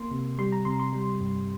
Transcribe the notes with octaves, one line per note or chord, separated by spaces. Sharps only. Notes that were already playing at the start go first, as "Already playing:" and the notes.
Already playing: A#3 C6
C3
G3 C6
A#5
C3 C6
C6
G3
G2